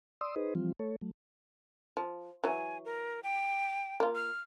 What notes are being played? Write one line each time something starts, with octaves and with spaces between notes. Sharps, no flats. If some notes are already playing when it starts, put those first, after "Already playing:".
D5 C6 D#6 E6
D#4 G#4 B4 C5 D#5
E3 F3 G3 C4 F4
A3 A4 C#5
F#3 A3
F3
E3 F#3 G#5
A#4
G5
A#3 F4
F6